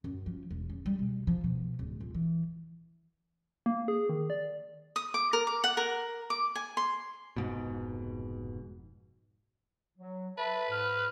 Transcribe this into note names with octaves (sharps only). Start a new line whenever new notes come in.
F#2
F3
E1
C#3
G3
B2
F3
B2
D1
F2
E3
A#3
G#4
D#3
D5
D#6
D6
A#4
D6
F#5
A#4
D6
G#5
C6
F1 G#2 B2
F#3
B4 E5 A5 B5
G#2 F6